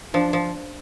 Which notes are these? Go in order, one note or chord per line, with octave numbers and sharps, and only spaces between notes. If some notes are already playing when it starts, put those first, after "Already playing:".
F3 D4
F3